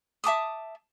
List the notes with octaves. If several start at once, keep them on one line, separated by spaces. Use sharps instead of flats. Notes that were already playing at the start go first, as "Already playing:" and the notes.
E5 A5 D6 D#6